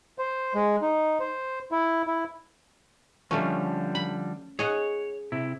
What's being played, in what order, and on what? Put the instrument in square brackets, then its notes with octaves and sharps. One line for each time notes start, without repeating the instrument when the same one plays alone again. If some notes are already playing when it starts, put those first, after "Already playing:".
[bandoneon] C5
G#3
D#4
C5
E4
E4
[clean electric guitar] D3 F3 G3 [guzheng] A3 C#4
[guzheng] B5
[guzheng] G#4 D#5 F#5 [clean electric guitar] C#5
[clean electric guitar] C3 E4